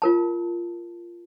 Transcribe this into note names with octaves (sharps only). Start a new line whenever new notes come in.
F4 A#4 A5